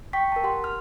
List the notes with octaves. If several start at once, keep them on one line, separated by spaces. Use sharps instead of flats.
G5 C#6 B6
A#4 A5
G4 F#5 C6
F6